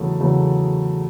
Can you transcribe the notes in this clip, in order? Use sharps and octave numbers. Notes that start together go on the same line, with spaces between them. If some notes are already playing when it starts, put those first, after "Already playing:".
Already playing: E2 C#3 F#3 A3
E2 C#3 F#3 A3